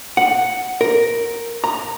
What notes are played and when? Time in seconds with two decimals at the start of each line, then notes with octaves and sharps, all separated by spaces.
0.17 F#5
0.81 A#4
1.64 A#5